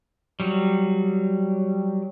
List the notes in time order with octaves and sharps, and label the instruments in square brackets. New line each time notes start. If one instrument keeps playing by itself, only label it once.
[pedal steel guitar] F#3 G3